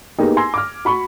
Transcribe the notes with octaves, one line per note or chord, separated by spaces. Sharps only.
A#3 B3 D#4 G4 G#4
G#5 C6 E6 G#6 A#6
D6 F6
F#4 B5 C#6